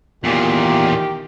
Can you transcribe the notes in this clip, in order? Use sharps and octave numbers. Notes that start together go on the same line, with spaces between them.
E2 A#2 D#3 F4 G4